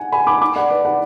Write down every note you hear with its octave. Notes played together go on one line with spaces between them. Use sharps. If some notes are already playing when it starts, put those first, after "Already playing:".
Already playing: F#5 G#5
G#5 B5
B5 D6
B5 D6
D5 F#5
B4 D5
D5 F#5